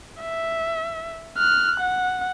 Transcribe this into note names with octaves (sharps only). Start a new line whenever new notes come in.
E5
F6 F#6
F#5